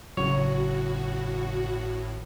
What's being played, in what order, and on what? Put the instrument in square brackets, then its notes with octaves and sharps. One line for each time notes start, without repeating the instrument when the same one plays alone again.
[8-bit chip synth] G#1 A2 [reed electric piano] C#3 F#3 [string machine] F#4 [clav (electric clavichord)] C#5